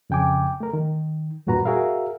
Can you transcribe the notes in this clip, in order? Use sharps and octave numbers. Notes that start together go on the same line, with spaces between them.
F2 C#3 G5 G#5 D6
A3 A#4
D#3
E2 G2 A#2 F#4 B4 A#5
F#4 G#4 A#4 E5 F5